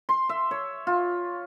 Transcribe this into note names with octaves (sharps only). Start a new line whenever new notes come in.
C6
E5
C#5
F4